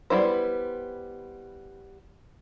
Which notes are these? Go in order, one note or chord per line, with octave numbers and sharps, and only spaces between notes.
G3 B3 E4 C5